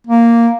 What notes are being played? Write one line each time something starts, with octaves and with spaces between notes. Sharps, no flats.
A#3